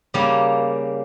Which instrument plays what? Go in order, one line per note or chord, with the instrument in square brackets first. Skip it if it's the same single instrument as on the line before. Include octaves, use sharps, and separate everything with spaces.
[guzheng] C#3 G3 A#3